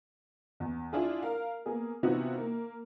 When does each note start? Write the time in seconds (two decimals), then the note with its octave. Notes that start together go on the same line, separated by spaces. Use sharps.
0.60 E2
0.93 D4 E4 F4 G#4
1.23 A#4 F5
1.66 A#3 B3 G#4
2.03 C3 E3 B3 D#4 F4 F#4
2.38 A#3